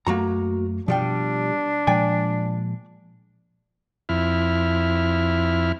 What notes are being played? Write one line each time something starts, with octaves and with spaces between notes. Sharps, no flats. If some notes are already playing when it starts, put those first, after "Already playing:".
F#2 F#3 A3 A#3 F#4 A#5
B2 F3 G3 D4 G5
A#2 F3 G#3 D5 G5 G#5
F2 E4 F6